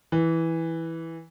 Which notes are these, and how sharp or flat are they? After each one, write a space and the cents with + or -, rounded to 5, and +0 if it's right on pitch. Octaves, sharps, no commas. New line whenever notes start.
E3 -5